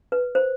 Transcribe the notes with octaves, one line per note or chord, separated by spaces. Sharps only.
B4
C5